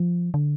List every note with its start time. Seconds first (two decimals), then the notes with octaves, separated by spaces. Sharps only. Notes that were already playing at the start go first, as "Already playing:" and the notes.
Already playing: F3
0.34 D3